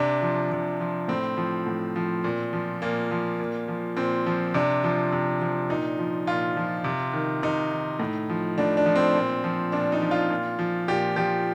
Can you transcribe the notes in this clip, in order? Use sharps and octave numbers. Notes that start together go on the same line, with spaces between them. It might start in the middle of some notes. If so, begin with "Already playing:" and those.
Already playing: C3 D4
F3
C3
F3
A2 C4
F3
A2
F3
A#2
F3
A#2 A#3
F3
A#2
F3
A#2 C4
F3
C3 D4
F3
C3
F3
A#2 D#4
F3
A#2 F4
F3
C3
D#3
C3 D#4
D#3
A2
F3
A2 D4
D4
F3
C4
A#2
F3
A#2 D4
D#4
F3
F4
A#2
F3
A#2 G4
F3 G4